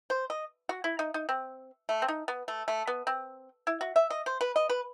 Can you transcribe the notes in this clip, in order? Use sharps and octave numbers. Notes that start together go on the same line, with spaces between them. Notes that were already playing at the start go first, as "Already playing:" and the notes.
C5
D#5
F#4
E4
D#4
D#4
C4
A3
C4
D#4
B3
A3
A3
B3
C4
E4
F#4
E5
D#5
C5
B4
D#5
B4